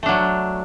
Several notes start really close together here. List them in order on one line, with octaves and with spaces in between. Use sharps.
A3 D4 F#3